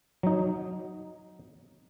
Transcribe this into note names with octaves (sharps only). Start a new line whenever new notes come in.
F#3 D#4